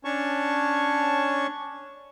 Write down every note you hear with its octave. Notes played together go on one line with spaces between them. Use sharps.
C#4 D4 C#5 A5 C#6